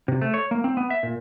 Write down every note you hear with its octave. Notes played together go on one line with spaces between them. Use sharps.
C3
A3
C#5
A#3
C4
B3
E5
A#2